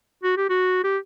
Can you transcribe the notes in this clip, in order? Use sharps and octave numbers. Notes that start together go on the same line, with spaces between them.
F#4
G4
F#4
G4